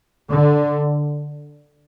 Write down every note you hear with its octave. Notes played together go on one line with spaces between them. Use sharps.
D3